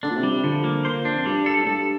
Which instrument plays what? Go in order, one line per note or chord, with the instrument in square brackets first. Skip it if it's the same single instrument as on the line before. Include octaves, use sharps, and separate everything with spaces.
[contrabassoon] D3 [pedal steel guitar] D4
[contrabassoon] A#2
C3
[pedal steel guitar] G3
[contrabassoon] C3
[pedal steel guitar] D3 [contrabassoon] F3
[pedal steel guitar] A#3
C5
D4
[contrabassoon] F2
[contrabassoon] G2 [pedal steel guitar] G3
[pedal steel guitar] A4
[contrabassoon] A2
[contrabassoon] G2 [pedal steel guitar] A4